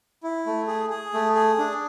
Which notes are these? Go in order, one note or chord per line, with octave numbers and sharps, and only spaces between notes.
E4
A3
G#4
G#4
A3
G#4
D4